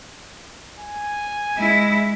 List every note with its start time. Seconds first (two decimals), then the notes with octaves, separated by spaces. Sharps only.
0.78 G#5
1.57 G#3 E4